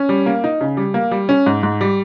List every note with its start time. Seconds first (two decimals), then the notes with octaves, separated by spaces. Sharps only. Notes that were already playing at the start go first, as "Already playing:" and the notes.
Already playing: C#4
0.09 G3
0.26 A#3
0.44 D#4
0.61 C#3
0.77 G3
0.94 A#3
1.11 G3
1.29 C#4
1.46 G#2
1.63 G#2
1.81 G3